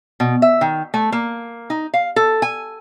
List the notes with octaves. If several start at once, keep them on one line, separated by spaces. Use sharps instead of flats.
B2
E5
D#3
A3
A#3
D#4
F5
A4
G#5